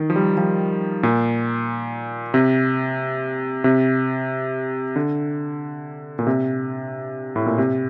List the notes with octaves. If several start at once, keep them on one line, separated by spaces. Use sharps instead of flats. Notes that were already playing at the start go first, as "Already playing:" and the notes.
Already playing: D#3
F3
G3
F3
A#2
C3
C3
D3
A#2
C3
A2
A#2
C3